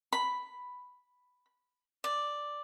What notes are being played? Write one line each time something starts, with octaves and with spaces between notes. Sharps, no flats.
B5
D5